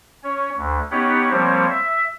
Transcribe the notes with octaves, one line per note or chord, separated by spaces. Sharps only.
C#4 C#5
D2
B3 C#4 D#4 G4 C#5 F#5
F3 G3 A#3 C4 C5 C#5
E5